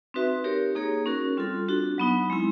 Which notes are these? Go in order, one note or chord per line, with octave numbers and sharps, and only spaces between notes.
C4 D#4 F#4 B4 E5
D#4 G4 A#4 C#5
A#3 D#4 G#4 C#5
C#4 F#4 A#4
G3 C4 F4 A4
D4 F#4 A4
F#3 B3 D#4
G#3 C4 E4